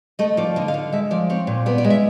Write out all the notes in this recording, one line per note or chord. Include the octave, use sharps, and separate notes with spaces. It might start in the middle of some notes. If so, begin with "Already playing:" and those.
A3 D#5
F3 D5
D3 D#5
F5
D3
G#3 E5
F3 D5
C4 C#5
A#2
B3 D5
D5
G#3
E5